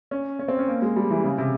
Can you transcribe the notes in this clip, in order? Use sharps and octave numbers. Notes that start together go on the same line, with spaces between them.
C#4
C#4
C4
C#4
A#3
G#3
G3
E3
C#3
C3